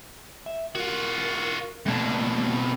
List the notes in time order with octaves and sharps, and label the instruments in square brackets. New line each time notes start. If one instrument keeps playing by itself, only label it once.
[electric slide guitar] E5
[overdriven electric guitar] F4 F#4 [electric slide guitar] A#4
[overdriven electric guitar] F2 B2 [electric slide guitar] A3 A#3 D4